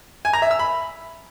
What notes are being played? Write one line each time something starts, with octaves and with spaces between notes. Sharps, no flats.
G#5
A#5
E5
E6
B5